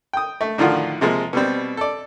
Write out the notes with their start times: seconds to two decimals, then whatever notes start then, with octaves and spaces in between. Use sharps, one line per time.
0.13 G5 D#6
0.41 A3
0.58 A2 D3 D#3 F3 F4 F#4
1.01 C3 F3 G#3 A#3
1.33 B2 G3 C4
1.77 A4 D5